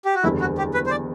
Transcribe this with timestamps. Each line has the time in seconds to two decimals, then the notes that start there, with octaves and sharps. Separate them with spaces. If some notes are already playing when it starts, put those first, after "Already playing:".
0.05 G4
0.15 F#4
0.23 F#1 E2 D3 G3 E4
0.40 F#4
0.58 G4
0.74 B4
0.86 C5
0.91 D5